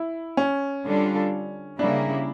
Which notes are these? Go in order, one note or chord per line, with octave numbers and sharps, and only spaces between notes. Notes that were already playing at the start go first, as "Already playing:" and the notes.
Already playing: E4
C#4
D3 G3 D4 F4 A4
C#3 G3 A#3 D4 E4